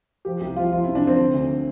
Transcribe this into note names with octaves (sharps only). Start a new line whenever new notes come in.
F3 G4
C2 G4
F3 F4
F3 F4
C3 E4
D4
F3 C4
D3
D2